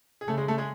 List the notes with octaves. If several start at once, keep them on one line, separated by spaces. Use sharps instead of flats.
G#4
C#3 A3 A4
G#3 G#4
A3 A4
G#3 G#4